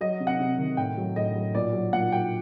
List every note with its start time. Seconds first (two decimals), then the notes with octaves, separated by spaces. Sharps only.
0.01 F#3 D#5
0.20 C3
0.27 F#5
0.40 C3
0.58 D#3
0.77 A2 G5
0.97 F#3
1.16 A2 D#5
1.35 F#3
1.55 A#2 D5
1.73 F#3
1.93 A#2 F#5
2.12 F#3 G5